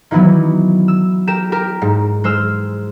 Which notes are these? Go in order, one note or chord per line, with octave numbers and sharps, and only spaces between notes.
D#3 E3 F#3 B3 E4
E6
G4 A#4 E7
G4 A#4
G#2
G#3 C5 E6 F6